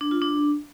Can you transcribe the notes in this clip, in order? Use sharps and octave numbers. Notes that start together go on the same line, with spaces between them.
D4
F4
D4